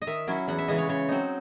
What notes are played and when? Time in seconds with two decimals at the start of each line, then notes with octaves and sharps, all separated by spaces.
0.02 D#5
0.07 D#3 E5
0.27 F#3 C#4 E4
0.48 E2 F#5
0.58 E5
0.68 C#3 E3 G#3 D#5
0.78 C#5
0.89 C#3 C#5
1.09 F#3 C4 D#4